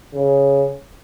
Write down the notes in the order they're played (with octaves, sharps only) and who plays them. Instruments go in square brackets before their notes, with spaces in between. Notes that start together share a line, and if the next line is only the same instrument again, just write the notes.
[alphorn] C#3